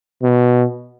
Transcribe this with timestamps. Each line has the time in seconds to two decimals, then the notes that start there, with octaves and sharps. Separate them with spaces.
0.22 B2